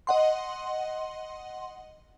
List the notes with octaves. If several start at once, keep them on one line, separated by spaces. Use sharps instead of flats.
D#5 F#5 C6